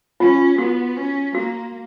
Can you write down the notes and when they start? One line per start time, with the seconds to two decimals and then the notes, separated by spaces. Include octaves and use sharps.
0.20 C#4 F4
0.58 B3 F#4
0.96 C#4
1.35 A#3 F#4